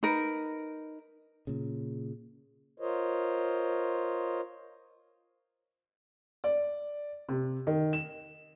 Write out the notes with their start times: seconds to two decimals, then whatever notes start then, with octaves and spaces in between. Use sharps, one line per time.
0.03 D#4 A#4 B4
1.47 A#2 C#3
2.80 F4 A#4 C5 C#5 D#5
6.44 D5
7.29 C3
7.67 D#3
7.93 E7